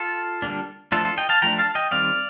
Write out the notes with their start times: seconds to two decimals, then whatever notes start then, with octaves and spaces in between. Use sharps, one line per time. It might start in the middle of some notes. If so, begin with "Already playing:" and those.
Already playing: F4 A4
0.42 D3 G3 A#3 D4
0.92 F3 A3 D4 F4 A4
1.05 F4 A4
1.17 D#5 G5
1.29 F5 A5
1.42 F3 A3 D4 G5 A#5
1.59 F5 A5
1.75 D#5 G5
1.91 D#3 G3 C4 D5 F5